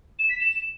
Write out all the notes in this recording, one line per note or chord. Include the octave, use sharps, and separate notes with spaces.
E7
B6
E7